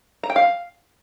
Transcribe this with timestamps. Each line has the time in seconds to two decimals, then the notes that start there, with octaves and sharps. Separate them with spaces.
0.23 A#5
0.30 G5
0.36 F5